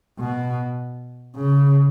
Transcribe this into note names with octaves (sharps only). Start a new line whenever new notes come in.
B2
C#3